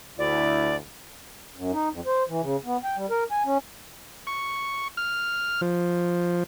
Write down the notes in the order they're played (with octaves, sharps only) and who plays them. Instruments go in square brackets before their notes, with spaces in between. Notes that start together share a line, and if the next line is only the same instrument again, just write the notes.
[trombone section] D2 E4 [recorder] D5
[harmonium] F#2
D#4
F2
C5
E3
C#3
B3
G5
G3
A#4
G#5
C#4
[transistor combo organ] C#6
F6
F3